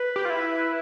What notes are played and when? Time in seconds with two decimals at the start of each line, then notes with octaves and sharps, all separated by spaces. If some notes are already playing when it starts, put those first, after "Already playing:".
Already playing: B4
0.16 G4
0.25 F4
0.30 E4